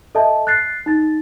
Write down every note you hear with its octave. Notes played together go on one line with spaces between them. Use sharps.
A4 D#5 E5 A5
F#6 A6 C7
D#4 A6